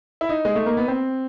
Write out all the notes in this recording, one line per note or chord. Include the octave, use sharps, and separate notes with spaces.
E4
D#4
G#3
A3
A#3
B3
C4